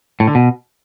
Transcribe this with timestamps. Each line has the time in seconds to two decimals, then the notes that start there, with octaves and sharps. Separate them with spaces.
0.20 A2
0.28 D3
0.35 B2